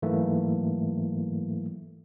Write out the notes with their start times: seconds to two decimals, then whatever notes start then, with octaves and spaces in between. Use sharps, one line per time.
0.02 G#2 E3 F#3 A3 A#3